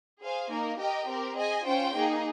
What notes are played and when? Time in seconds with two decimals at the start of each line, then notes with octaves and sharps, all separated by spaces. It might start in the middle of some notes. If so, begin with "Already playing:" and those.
0.21 G#4 C5 F5 G#5
0.50 A#3 D#4 A#4
0.78 G4 A#4 D#5 G5
1.07 C4 G4 A#4
1.36 G#4 D#5 G#5
1.65 C#4 F4 C5 G5
1.94 A#3 D#4 G#4